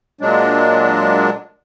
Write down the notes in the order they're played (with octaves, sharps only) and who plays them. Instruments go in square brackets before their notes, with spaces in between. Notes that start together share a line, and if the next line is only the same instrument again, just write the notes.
[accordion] A#2 F#3 G#3 D4